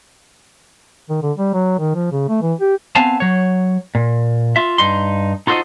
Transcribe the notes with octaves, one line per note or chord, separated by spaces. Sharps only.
D#3
D3
G3
F#3
D#3
F3
C#3
A3
E3
G4
B3 C4 F5 G#5 A5
F#3 C#5
A#2
F4 E5
G2 D#4 C6
D#4 F4 F#4 A4 C5 D#5